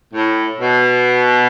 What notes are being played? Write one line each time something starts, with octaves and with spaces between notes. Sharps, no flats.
A2
B2